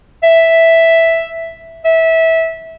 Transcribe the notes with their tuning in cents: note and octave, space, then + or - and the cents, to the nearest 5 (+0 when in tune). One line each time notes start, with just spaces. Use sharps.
E5 +0
E5 -20